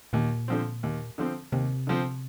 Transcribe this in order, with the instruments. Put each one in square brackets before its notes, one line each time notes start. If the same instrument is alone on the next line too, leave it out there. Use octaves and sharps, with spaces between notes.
[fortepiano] D#2 [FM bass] A#2
[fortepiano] D3 F3 C4
D#2
D3 F3 C4
[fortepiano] D#2 [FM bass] C3
[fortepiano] D3 F3 C4